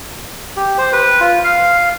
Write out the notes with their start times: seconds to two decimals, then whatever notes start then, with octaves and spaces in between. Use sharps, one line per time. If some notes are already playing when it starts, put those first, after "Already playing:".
0.56 G4
0.78 C5
0.93 B4
1.20 F4
1.44 F5